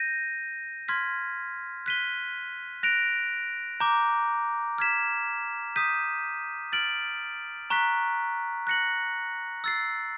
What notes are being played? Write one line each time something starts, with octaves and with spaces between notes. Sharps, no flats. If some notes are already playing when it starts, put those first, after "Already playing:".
Already playing: G6 A#6 D#7
C6 F6 G#6 B6
F#6 B6 D#7 G7
F#6 A#6 D7 F7
A#5 D6 G6
F6 G#6 B6 E7
D#6 G6 B6 D#7
F6 A6 D7 F#7
A#5 C#6 F#6 B6
F#6 A#6 C#7 F#7
E6 A6 C7